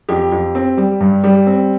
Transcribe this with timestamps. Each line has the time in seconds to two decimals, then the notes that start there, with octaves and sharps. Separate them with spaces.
0.08 F2 G4
0.32 F2
0.55 C4
0.77 G3
1.01 G2
1.24 G3
1.47 C4